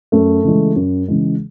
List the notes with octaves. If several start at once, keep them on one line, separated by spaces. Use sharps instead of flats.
F#2 A3
C#3 E3 G#3
F#2
C#3 E3 G#3